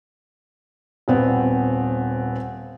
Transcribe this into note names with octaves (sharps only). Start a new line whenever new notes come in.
D#1 B3 C4